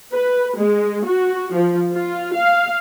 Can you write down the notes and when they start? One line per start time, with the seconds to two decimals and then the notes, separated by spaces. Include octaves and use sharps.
0.13 B4
0.57 G#3
1.06 F#4
1.54 F3
1.92 F4
2.35 F5